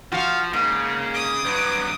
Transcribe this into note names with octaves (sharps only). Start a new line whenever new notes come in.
F3 F#4 F5
G#2 C#3 A#3
D6 D#6
G2 F#3 B4